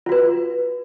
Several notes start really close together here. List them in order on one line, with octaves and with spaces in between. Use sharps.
F4 F#4 B4